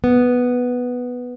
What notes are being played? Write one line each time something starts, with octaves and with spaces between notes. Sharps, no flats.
B3